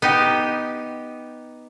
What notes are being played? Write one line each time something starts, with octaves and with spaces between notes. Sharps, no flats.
B3 D#4 G4